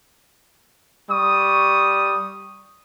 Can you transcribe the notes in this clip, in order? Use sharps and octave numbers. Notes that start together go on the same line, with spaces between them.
G3 C#6 D#6